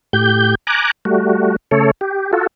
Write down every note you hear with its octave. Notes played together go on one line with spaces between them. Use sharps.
A2 G4 G6
G#5 A#5 D6 F#6
G3 A3 F#4
C#3 A3 A4 C#5
G4
F4 F#4 A4